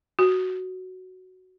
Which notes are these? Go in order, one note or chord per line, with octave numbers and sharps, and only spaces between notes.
F#4